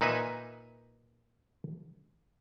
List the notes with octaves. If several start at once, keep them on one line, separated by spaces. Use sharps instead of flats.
A#2 D#4 B4 E5 G#5